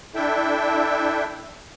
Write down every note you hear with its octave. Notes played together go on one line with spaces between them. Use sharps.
D4 E4 A4 E5 G5